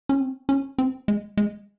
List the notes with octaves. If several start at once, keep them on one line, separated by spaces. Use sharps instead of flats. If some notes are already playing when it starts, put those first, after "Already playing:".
C#4
C4
C#4
C4
G#3
G#3